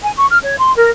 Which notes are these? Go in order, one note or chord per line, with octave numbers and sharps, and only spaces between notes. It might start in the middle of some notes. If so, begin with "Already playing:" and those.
G#5
C#6
F6
C#5
C6
A#4